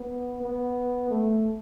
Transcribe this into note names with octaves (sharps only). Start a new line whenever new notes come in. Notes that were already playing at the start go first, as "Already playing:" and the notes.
Already playing: B3
B3
A3